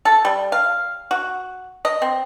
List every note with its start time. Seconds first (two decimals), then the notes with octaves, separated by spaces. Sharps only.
0.05 A4
0.25 G3
0.52 F5
1.11 F#4
1.85 D#5
2.02 C4